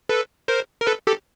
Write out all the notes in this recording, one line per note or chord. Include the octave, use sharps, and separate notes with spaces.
A4 B4
A#4 C5
A#4
A4 B4
G4 A4